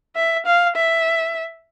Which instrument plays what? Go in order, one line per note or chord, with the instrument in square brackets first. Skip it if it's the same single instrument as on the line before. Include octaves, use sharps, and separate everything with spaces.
[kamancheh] E5
F5
E5